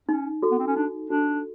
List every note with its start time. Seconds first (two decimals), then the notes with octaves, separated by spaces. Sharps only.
0.09 C#4 D#4
0.43 F#4 A4
0.52 B3
0.59 C4
0.68 C#4
0.76 D4 D#4
1.10 D4 F#4 A4